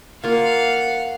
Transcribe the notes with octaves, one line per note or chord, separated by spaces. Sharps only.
A#3 F4 F5 F#5